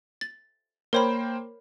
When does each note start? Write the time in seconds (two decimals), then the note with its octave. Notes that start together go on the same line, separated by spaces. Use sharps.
0.21 A6
0.93 A#3 A#4 C5 C#5 G5 B5